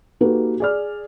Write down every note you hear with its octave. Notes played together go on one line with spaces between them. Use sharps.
A#3 D#4 F#4 G4 A4 B4
G#4 D5 F6